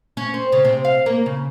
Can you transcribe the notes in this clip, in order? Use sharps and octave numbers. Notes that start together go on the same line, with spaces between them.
C#4
C4
C#3
C3
F5
A#3
C#3